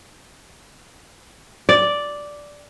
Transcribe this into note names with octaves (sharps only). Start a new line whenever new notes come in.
D5